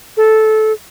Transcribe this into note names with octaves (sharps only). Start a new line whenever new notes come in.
A4